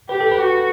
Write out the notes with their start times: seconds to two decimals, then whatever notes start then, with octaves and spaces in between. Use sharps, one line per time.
0.09 G4 B4
0.21 A4
0.32 B4
0.39 F#4